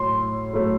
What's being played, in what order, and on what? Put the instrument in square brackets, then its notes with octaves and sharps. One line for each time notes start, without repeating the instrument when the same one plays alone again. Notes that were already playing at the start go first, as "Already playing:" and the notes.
Already playing: [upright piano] A2 F#3 A3 [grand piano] C6
[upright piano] A2 F#3 A3